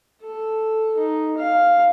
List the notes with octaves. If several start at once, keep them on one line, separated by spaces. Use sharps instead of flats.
A4
D#4
F5